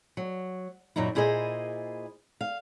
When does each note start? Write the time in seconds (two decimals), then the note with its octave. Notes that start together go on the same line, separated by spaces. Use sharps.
0.17 F#3
0.96 F#2 A#2 F#3 D#4 E4
1.15 A#2 E4 G#4 C5 D#5
2.41 F5